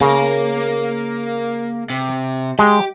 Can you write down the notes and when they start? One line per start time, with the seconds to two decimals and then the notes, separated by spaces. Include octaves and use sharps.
0.01 C#3 A#3 A#4
1.90 C3
2.59 G#3 G4